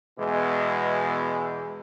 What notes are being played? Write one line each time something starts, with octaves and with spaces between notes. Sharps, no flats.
E2 B2 E3 G#3